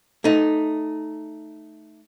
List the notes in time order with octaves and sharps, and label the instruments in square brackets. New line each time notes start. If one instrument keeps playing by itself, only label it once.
[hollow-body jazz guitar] A3 D#4